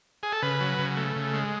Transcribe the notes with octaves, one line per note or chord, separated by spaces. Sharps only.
G#4
A4
C#3 B4
F#3
C#3
A3
C#3
G#3